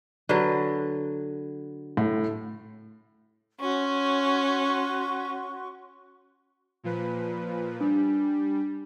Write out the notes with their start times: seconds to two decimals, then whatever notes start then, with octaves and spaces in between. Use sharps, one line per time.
0.29 D3 F#3 B4
1.97 A2
3.60 C#4 F#4 C6 C#6
6.84 A#2 F3 B4
7.81 G3 D4